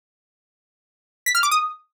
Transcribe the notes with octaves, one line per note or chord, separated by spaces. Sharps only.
B6
F6
D6
D#6